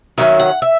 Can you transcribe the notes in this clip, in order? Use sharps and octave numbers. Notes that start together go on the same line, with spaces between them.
D#3 F#3 C#4 E5
F#5
E5